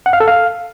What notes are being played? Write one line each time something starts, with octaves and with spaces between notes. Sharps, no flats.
F#5
F5
A4
F5